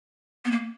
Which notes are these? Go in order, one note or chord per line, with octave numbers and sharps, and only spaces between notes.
B3
A#3